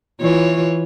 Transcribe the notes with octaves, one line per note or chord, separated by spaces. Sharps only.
E3 F4 C#5